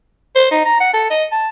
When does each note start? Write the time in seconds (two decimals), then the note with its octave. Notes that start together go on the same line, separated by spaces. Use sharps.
0.35 C5
0.51 D#4
0.65 A#5
0.80 F#5
0.93 A4
1.10 D#5
1.32 A5